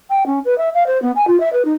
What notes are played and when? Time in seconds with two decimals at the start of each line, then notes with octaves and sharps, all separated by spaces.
0.10 G5
0.26 C#4
0.45 B4
0.58 E5
0.74 F5
0.86 C5
1.02 B3
1.15 G#5
1.27 F4
1.40 E5
1.53 B4
1.65 D#4